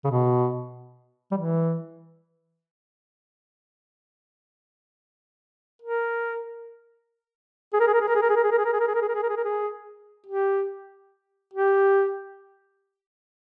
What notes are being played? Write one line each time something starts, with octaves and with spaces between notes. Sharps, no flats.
C#3
B2
G3
E3
A#4
G#4
A#4
G#4
A#4
G#4
A#4
G#4
A#4
G#4
A#4
G#4
A#4
G#4
A#4
G#4
A#4
G#4
A#4
G#4
A#4
G#4
A#4
G#4
A#4
G#4
G4
G4